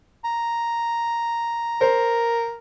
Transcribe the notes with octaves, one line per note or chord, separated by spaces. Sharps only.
A#5
A#4 C5